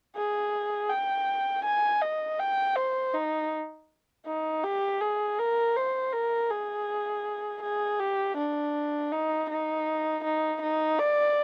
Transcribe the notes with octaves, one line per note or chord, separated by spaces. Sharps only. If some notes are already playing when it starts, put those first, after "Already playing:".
G#4
G5
G#5
D#5
G5
C5
D#4
D#4
G4
G#4
A#4
C5
A#4
G#4
G#4
G4
D4
D#4
D#4
D#4
D#4
D5